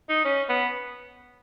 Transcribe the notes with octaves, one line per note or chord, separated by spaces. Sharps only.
D#4
C#4
B3